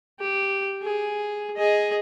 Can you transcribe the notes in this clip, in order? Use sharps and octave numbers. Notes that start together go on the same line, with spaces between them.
G4
G#4
G#4 D#5